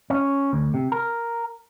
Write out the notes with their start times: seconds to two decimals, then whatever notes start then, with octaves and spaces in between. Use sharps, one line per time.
0.10 C#4
0.53 D2
0.74 C3
0.92 A#4